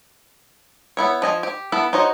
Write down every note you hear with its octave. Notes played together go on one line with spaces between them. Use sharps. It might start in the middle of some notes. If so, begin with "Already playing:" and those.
B3 E4 C#5
F3 D#5 G#5
G4
B3 E4 A4 B5
D#4 F#4 C5 C#5 D#5